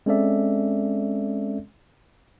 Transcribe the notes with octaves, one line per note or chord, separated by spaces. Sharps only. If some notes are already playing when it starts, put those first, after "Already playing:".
G#3 C4 C#4 A4 D5 E5